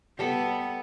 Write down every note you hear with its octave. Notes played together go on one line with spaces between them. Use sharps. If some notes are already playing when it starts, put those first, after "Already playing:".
G3 B3 A4 B5